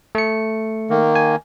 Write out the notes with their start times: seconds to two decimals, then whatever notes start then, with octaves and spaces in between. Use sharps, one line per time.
0.15 A3 C#7
0.90 D#3 A#3
1.15 G#5